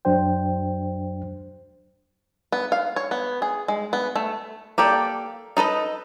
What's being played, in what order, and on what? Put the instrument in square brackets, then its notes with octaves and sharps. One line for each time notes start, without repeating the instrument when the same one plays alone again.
[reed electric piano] F#2 F#3 D4 C5 G5
[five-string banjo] B3
F5
C#5
B3
G#4
G#3
B3
A3
A#3 G4 A4 D5
D#4 A4 B4 D#5